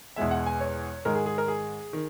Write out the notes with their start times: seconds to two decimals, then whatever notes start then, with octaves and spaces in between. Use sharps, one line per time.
0.16 E2 B2 G#3 E5
0.31 F#5
0.47 G#5
0.60 C#5
1.05 G#2 D#3 G#3 A#4
1.15 G#4
1.26 G#4
1.38 A#4
1.48 G#4
1.93 D#3